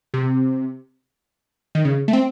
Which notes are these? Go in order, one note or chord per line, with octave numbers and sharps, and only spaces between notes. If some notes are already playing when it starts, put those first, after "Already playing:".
C3
D#3
C#3
A3
C4